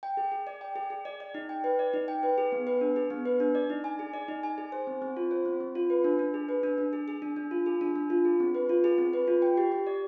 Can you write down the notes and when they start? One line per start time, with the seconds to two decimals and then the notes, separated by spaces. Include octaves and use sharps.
0.03 G5
0.17 G#4
0.32 G#4
0.47 D5
0.61 G5
0.76 G#4
0.90 G#4
1.05 D5
1.20 D5
1.34 D#4
1.49 G5
1.64 B4
1.79 D5
1.94 D#4
2.08 G5
2.23 B4
2.38 G#4
2.52 B3
2.67 B4
2.81 D4
2.96 G#4
3.10 B3
3.25 B4
3.40 D4
3.55 D5
3.70 D#4
3.84 G#5
3.99 G#4
4.14 D5
4.28 D#4
4.43 G#5
4.58 G#4
4.72 C5
4.87 C4
5.02 C4
5.17 F4
5.31 C5
5.45 C4
5.60 C4
5.75 F4
5.90 B4
6.04 D4
6.19 D4
6.34 G#4
6.49 B4
6.63 D4
6.78 D4
6.93 G#4
7.08 G#4
7.22 D4
7.36 D4
7.51 F4
7.66 G#4
7.81 D4
7.96 D4
8.10 F4
8.25 G#4
8.40 C4
8.55 B4
8.69 F4
8.84 G#4
8.98 C4
9.13 B4
9.28 F4
9.42 G5
9.57 G4
9.72 G4
9.87 D5